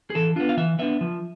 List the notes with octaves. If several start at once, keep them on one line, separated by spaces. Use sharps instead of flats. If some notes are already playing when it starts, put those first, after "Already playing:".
G#4
E3 A4
B3 D4 F4
F5
E3 E5
B3 D4 E5
F3